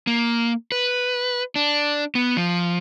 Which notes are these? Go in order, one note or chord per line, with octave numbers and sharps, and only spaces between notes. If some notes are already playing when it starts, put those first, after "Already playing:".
A#3
B4
D4
B3
F3